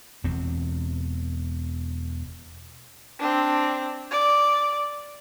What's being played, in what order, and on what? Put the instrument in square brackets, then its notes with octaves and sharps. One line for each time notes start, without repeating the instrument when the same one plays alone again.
[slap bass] E1 E2 C4
[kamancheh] C4 D4
D5